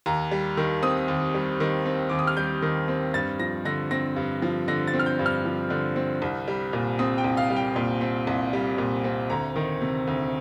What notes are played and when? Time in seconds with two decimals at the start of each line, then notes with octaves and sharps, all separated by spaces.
0.06 D#2 A#5
0.31 G3
0.57 D#3
0.83 C4 D#6
1.08 D#2
1.34 G3
1.60 D#3
1.86 C4
2.10 D#2 D6
2.19 D#6
2.27 F6
2.37 G3 G6
2.62 D#3
2.88 C4
3.14 G2 A6
3.39 F3 A#6
3.65 D3 A#6
3.91 C4 A#6
4.16 G2
4.42 F3
4.68 D3 A#6
4.87 A6
4.94 C4
4.99 F6
5.06 G6
5.19 G2
5.26 F6
5.45 F3
5.70 D3
5.96 C4
6.22 C2
6.48 G3
6.73 A#2
6.99 C4 D#6
7.18 G5
7.24 C2
7.37 F5
7.50 G3
7.56 G5
7.76 A#2
8.01 C4
8.27 C2
8.53 G3
8.78 A#2
9.04 C4
9.30 D2 A#5
9.56 D#3
9.81 C3
10.07 D2